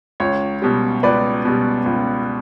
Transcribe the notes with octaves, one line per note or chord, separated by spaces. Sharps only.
C#2 C#5
B2 G3
C#2 B4 D5
B2 G3
C#2